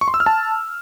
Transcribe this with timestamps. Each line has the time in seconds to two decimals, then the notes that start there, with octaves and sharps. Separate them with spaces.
0.01 C#6
0.08 C6
0.14 E6
0.20 F6
0.26 A5